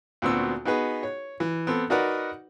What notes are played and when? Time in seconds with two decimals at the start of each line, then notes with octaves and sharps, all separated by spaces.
0.22 D2 A#2 B3 C4 F#4 E6
0.65 B3 D#4 F#4 G#4 B4
1.03 C#5
1.40 E3
1.67 B3 C4 A4
1.90 D#4 F#4 A#4 B4 D5 F#5